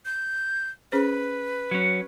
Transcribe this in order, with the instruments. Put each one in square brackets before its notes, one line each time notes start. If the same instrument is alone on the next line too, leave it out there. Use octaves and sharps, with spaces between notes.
[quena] G6
[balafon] C#4 G#4 C5 [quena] B4
[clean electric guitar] F#3 C#4